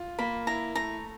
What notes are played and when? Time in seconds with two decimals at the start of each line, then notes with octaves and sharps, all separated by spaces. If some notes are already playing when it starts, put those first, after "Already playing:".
Already playing: F4
0.19 A#3 B5
0.47 E4 A#5
0.75 A3 A#5